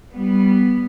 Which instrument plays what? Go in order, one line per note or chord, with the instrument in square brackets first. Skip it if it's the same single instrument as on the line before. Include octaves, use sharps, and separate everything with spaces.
[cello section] G3 B3